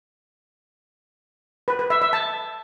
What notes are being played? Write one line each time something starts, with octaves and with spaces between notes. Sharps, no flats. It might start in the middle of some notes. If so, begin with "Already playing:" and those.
B4
B4
E5
E5
A5